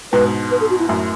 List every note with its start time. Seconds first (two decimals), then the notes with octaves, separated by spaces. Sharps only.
0.12 G#2 B2 B4
0.51 B4
0.61 A4
0.70 F#4
0.79 E4
0.89 F#2 A2